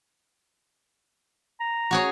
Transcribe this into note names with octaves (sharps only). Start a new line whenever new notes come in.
A#5
F#4 G#4 C#5